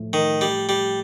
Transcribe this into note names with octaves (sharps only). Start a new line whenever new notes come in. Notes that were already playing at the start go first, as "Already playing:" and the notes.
Already playing: A2 F3 A3
D#3
G3
G3